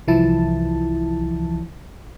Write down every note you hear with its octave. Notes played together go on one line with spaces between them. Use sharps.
C2 E3 F3 E4 A5